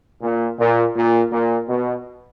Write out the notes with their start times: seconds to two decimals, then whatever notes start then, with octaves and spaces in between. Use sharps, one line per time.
0.22 A#2
0.59 A#2
0.96 A#2
1.32 A#2
1.68 B2